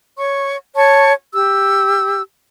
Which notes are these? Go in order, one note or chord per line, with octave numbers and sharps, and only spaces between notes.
C#5 C#6
C#5 A5 C#6
G4 E6